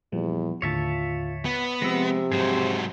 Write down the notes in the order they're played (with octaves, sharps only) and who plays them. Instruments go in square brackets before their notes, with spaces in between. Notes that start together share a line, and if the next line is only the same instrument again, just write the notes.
[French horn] E2 [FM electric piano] A#2 F3 G3
[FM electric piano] D#2 A2 D3 [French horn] F4 [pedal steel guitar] C#5 E5 A5
[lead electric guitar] B3
[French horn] C3 [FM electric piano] F3 E6 [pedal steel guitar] G#3 C4
[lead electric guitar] G#2 F#3 [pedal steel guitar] G#4 C5